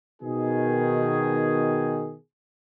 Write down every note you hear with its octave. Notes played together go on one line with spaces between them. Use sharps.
B2 D#3 G#4